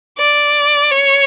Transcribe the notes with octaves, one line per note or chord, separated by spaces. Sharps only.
D5
C#5